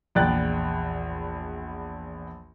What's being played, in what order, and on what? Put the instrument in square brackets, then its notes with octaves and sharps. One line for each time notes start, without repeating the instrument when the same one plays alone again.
[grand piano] A#1 E2 D5 G5 F#6 A6